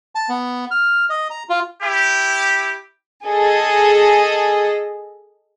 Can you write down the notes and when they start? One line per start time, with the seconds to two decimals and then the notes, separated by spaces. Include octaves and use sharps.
0.15 A5
0.29 B3
0.71 F6
1.10 D#5
1.30 A#5
1.49 F4
1.82 E4 G4
3.25 G#4 A4 D#5